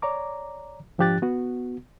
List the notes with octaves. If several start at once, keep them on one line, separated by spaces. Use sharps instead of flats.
C#5 D5 A#5 D6
G#2 F3 D4 G4 F#6 A6
B3 F#4